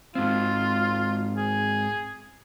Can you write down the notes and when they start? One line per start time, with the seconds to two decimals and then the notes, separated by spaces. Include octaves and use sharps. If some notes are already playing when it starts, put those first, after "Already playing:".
0.15 G#2 C4 F4
1.37 G#4